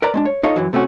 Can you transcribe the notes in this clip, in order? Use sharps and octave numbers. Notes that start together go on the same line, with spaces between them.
A#4 B4 D5 A#5
G#3 C#4 D4
C#5
D#4 F4 A4 C#5 D#5 F5
F#2 E3 F#3
C3 A3 C#4 F#4